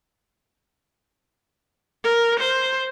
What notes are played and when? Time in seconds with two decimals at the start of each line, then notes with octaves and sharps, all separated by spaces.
2.05 A#4
2.40 C5